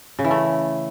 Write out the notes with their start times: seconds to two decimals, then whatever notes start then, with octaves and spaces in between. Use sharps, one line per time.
0.19 C#3
0.25 E3
0.31 A3